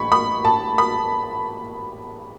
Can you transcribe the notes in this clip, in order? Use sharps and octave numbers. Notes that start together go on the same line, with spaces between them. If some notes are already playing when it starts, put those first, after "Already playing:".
Already playing: A1 G#3 B5 C#6
B5
A5
B5